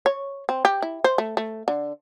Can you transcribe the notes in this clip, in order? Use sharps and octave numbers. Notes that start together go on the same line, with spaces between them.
C#5
C4
G4
E4
C5
A3
A3
D3